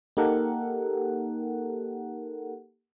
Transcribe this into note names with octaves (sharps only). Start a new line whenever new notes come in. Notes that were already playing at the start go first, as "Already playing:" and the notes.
A#3 D#4 G4 A4 A#4 F#5